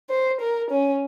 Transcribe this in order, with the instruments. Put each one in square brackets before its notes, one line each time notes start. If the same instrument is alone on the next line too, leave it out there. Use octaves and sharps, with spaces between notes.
[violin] C5
A#4
C#4